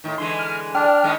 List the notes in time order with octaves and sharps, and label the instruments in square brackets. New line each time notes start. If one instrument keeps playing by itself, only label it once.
[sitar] A2 D#3
[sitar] D3 E3 G#3 [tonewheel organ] C6
[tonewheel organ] F6
[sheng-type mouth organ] D4 [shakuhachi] D5 [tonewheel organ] G5 F6
[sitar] D#3 G#3 B3